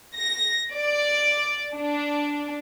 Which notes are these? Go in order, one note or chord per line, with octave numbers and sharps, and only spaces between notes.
A#6
D5
D4